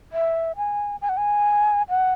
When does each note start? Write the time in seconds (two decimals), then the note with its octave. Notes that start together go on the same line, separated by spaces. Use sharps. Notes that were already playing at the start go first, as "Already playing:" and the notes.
0.12 E5
0.56 G#5
1.02 G#5
1.09 F#5
1.17 G#5
1.89 F#5